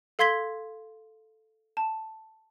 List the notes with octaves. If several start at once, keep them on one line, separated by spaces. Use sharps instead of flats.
A4 F5 C6 G#6 B6 G7
A5